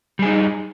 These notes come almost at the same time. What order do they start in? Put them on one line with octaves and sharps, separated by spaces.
G3 G#4 D#4